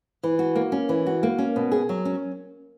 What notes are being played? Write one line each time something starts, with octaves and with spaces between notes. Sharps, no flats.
E3
F#4
A#3
C#4
E3
F#4
A#3
C#4
B2
G#4
F#3
C#4